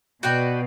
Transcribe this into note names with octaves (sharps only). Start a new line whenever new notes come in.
B2 F#4 B4 D5 G5